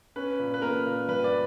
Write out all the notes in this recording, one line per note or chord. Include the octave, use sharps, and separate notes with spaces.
C#4 B4
A#2
B4
A#3 A#4
A#2
G2 B4
D5